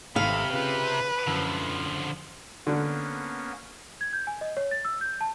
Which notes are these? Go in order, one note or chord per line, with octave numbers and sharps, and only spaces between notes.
G#1 C3 A3 D#4 F5 B5
C#3 F4 B4
F#2 D3 F3 E4 E5
D3 A#3 B3 C#4
G#6
G6
G#5
D#5
C#5
A6
E6
G6
A5